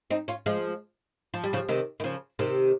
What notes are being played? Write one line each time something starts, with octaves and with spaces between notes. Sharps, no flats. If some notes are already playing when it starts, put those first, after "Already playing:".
C4 D#4
C#4 F4
F3 G#3
F3
G3
C#3 F3
C3 D#3
D#3
C#3 F3
C3 D#3